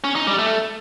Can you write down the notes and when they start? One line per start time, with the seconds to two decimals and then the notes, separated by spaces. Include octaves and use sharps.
0.04 C#4
0.16 D#4
0.27 G3
0.38 A3